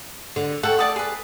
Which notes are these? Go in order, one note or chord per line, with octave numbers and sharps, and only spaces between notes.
D3
A4 F#5 G5 C#6
D5 A5 D#6
G#4 B4